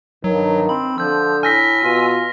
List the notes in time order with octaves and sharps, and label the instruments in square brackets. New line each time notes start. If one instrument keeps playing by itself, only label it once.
[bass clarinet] G2 [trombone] D#3 [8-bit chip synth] F#3
[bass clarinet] C4 [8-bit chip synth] B5
[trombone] D3 [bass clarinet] F3 [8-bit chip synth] E6 G6
[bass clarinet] A2 [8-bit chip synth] G#5 E6 [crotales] F6 A#6 B6
[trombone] B2 [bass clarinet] F4